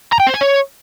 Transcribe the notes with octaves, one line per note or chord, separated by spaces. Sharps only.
A#5
G5
C5
G#5
C#5